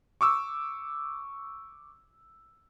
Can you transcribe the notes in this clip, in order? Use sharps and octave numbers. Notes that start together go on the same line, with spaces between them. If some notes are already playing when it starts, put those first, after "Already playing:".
C#6 D6 E6